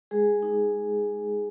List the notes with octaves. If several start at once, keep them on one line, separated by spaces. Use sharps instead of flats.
G#3 G#4
D#4